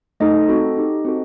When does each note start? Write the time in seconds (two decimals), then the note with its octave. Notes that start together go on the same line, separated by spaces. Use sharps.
0.20 A3 D#4 A4 D#5
0.49 C4 F#4 A4
0.77 D#4 G4
1.05 C4 F#4 A4